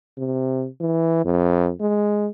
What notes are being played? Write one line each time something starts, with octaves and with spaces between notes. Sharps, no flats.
C3
E3
F2
G#3